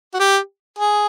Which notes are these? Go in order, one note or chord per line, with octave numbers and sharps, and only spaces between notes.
F#4
G4
G#4